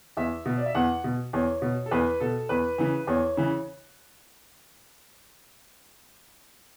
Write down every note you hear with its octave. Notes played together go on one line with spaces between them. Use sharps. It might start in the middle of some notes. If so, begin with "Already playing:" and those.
E2 E5
B2
D5
E5
E2 F#5
B2
E2 C#5
B2
A4
E2 B4
B2 A4
E2 B4
C#3 E3
E2 C#5
C#3 E3